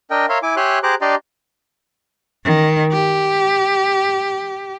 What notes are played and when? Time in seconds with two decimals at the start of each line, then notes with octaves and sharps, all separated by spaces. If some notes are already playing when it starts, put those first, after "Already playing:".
0.11 D4 A#4 D#5 G5
0.29 A#4 C#5 E5 F5 C6
0.43 E4 G#5 D6
0.56 G4 C#5 E5 G#5 C6 F#6
0.83 G4 G#4 C5 A#5 D6 F#6
1.01 D4 G4 D5 D#5 A#5 C6
2.44 D#3
2.92 G4